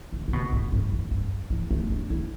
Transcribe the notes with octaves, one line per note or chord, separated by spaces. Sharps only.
D3
D3
B2
A2
G2
E2
G2
E3
A3
D4
E4